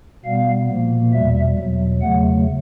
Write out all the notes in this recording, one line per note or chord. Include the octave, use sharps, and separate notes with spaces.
B2 G3 B3 F5
A#2 F3 A#3
E2 B2 G3 E5
E2 B2 F#3
E2 C#3 F#3 A3 F#5